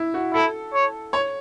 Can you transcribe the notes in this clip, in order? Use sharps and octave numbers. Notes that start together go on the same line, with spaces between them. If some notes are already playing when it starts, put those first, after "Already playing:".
Already playing: E4
F#4
E4 A4
C#5
C#5